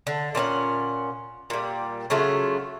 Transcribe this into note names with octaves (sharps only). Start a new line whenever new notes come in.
D3
A#2 C#4 A4 F#5
A#2 G3
C#3 F#3 A3 F4